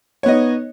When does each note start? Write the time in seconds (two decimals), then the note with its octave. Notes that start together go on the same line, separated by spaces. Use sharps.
0.23 C#5
0.26 B3
0.28 D#5
0.31 D#4